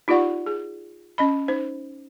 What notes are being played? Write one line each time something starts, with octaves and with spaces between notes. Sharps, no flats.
D#4 F4 G4 D5 F#5 C#6
G#4
C#4 D#5 B5
D#4 C5